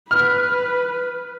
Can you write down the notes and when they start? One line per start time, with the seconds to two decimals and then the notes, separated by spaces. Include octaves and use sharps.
0.11 B4 F6